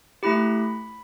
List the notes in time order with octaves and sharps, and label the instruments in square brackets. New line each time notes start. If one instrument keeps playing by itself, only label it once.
[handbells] A3 E4 G4 B5